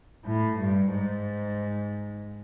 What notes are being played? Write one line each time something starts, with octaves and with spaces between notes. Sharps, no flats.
A2
G2
G#2